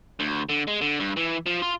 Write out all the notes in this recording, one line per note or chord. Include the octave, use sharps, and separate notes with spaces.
D2
D3
G#3
D3
G2
E3
F3
F4